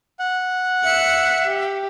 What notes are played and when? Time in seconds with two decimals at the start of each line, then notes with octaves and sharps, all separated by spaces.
0.19 F#5
0.84 E5 F#6 C#7
1.44 G4